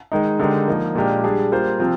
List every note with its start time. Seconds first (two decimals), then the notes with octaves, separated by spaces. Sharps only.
0.12 D#3 G#3 D#4
0.39 D3 G#3 D#4 G4 A#4
0.68 F3 A#3 D#4
0.95 A#2 G#3 D4 G4 A#4
1.24 G3 D4 G#4
1.52 G3 A#3 F4 C5
1.80 C3 F3 C4 F4